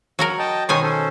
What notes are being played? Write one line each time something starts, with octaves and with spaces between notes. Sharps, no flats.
F#3 F#4 A#4
D#5 G5 A5
B2 D#3 C5 C#5 G#5 D#6
C#4 A4 C5